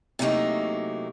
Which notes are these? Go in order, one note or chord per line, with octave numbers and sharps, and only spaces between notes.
C3 F#3 A3 A#3 D#4 E4